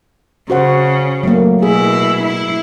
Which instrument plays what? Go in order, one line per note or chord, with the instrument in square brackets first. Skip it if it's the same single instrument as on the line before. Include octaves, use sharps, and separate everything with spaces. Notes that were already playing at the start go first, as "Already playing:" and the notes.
[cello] C#3 [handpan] F#4 C5 F#5
[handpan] F#3 A3 A#3
[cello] B2 E4 [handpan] G#4
[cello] E4